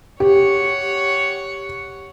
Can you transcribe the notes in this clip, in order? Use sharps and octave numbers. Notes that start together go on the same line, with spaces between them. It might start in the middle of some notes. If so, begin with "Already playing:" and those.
G4 C#5 F#5